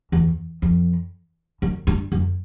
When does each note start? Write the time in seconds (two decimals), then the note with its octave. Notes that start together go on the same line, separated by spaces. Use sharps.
0.12 E2
0.62 F2
1.62 F#2
1.87 G2
2.12 F#2